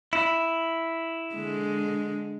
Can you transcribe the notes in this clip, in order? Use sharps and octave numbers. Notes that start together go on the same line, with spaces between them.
E4
D3 G#3